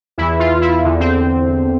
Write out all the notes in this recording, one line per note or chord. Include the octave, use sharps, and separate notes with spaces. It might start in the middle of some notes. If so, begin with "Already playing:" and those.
E2 E3 E4
F4
E4
E2 D3
C4